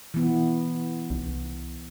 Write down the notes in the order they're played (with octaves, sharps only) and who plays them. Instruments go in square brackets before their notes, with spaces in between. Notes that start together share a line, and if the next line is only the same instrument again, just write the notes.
[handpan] E3 B3
[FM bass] C2